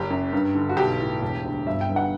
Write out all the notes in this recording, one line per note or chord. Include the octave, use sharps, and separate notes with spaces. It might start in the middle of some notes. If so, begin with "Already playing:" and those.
Already playing: F#1 G4
F#2
G2
D3
F#4
B1 G4
A2
E1
D2
G1 E5
G5
G2
F#5